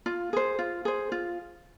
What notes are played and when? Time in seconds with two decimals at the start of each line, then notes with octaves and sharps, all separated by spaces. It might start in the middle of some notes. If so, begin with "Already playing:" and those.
0.06 F4
0.33 G#4 C5
0.59 F4
0.85 G#4 C5
1.12 F4